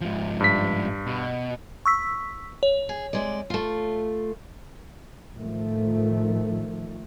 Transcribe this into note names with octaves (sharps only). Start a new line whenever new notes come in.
G#2 F3
G2 B6
B2
C#6 E6 B6
C#5
G#4
C3 G#3 D5
A3 F4
A2 D#3 F3 A3